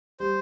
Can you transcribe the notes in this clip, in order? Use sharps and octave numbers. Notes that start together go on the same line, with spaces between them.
G3 C5